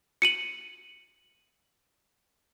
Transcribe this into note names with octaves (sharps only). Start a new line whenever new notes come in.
C#7 D#7 F#7